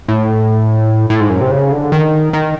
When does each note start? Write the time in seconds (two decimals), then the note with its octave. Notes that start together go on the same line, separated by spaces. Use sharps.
0.08 A2
1.10 A2
1.20 G#2
1.30 F#2
1.41 C3
1.51 C#3
1.72 D3
1.92 D#3
2.33 D#3